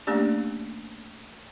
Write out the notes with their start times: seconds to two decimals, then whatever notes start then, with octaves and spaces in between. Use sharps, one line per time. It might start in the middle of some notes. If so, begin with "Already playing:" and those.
0.07 A3 A#3 C#4 D4 G4 D5